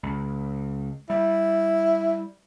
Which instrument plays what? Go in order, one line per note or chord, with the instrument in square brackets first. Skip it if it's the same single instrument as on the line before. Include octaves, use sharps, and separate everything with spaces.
[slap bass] C#2
[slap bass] G3 [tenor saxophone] E4